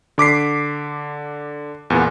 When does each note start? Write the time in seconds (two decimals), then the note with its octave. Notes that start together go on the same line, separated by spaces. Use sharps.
0.18 D3 D6 B6 C7
1.90 E2 A#2 B3